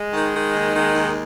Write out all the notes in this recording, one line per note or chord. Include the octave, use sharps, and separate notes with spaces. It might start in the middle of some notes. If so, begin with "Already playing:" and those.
Already playing: G#3
D#3
D#3
D#2
D#3
D#2